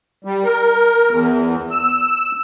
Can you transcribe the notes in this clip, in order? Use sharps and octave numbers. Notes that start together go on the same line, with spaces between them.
G3
A#4
E2
E6